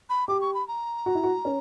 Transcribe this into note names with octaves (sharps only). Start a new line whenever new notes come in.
B5
G4 D6
C#6
B5
A#5
F#4
E4
F#4
C#4